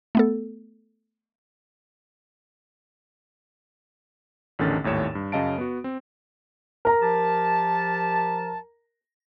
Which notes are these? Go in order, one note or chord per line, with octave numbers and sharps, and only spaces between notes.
A3 B3 A4
A1 E2 D3 D#3 C#4 A6
G#1 D#2 A2 C#5 E7
G2
F#2 C#3 D#5 F5 A5 D7
B3 F#4
C4
A#4 A#5
F3 G4 A5